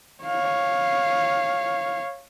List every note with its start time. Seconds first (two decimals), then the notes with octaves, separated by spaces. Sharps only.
0.24 C#5 F5